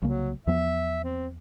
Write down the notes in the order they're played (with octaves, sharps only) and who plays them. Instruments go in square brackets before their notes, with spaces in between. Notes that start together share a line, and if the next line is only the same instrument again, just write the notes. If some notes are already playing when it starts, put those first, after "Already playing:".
[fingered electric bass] C2 C#3 A#3 [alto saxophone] F#3
[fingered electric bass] E2 F3 B3 [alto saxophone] E5
[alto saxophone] C4